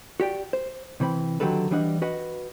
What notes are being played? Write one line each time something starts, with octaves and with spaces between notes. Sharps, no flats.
F#4 G4 D5 G5
C5
C3 E3 C4 B5
D3 D#3 F#3 G4 A4 B4
E3 G3 D4 D#5 F#5
F#4 B4 D#5 F#5